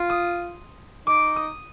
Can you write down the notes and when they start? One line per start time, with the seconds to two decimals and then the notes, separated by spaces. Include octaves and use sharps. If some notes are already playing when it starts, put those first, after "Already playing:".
Already playing: F4 C6
0.10 D#6
1.07 D#4 D6
1.36 D#6